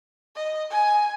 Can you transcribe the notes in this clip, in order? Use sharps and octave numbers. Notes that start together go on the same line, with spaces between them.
D#5
G#5